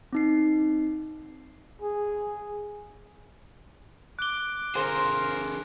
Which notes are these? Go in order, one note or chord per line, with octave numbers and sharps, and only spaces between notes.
C4 D#4 C7
G#4
D6 F#6 G7
D3 F4 G#4 A#4 C5